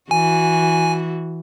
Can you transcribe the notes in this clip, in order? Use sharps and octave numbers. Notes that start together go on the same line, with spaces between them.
E3 F#4 G#5